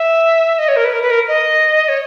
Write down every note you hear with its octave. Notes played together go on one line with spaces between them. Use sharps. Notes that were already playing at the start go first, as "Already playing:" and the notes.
Already playing: E5
D#5
C#5
A#4
B4
A#4
B4
A#4
D#5
C#5